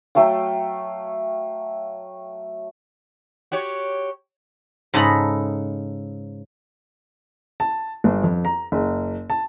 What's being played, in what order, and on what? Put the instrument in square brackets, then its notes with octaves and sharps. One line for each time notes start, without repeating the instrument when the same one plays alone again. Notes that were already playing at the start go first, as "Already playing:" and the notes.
[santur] F#3 A3 F5 G5
[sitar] F#4 G4 C#5
[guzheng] G#2 C#3 A4 D#5 A#5 B5
[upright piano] A5
G1
F2
A#5
F#1
A5